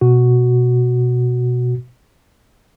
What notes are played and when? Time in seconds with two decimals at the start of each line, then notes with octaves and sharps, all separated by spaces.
0.01 B2 F#4